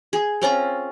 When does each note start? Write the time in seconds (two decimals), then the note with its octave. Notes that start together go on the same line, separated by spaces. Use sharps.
0.13 G#4
0.42 C4 C#4 F4 A#5